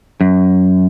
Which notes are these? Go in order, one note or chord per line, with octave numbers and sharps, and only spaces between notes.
F#2